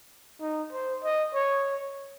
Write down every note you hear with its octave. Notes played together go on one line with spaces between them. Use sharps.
D#4
C5
D#5
C#5